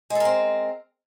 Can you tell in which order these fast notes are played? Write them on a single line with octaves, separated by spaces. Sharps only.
G#3 A4 A#4 C4